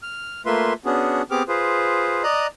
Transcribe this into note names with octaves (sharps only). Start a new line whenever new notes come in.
F6
A3 A#3 F4 B4 E5 C6
B3 C#4 D4 F#4 G#4
B3 C4 G4 G#4 D6 F6
F4 G#4 B4 C5
D5 D#5 A#5 D#6 F#6